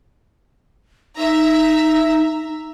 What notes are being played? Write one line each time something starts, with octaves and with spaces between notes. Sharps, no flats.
D#4 E5 A#5